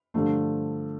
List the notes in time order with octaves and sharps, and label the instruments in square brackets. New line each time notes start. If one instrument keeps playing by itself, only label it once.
[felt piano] G2 D3 F3 A3